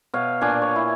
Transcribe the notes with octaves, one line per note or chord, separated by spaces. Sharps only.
B2 C#5 F5
A#2 D4 G#5
C#5
E4